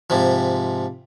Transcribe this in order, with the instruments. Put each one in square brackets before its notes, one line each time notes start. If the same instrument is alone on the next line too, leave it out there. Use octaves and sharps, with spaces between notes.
[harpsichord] G#2 C3 F3